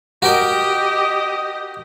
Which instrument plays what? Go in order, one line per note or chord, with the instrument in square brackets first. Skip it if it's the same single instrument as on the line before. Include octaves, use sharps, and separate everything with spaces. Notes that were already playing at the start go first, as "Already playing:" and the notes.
[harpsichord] F#4 A#4 G5 [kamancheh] G4 D#5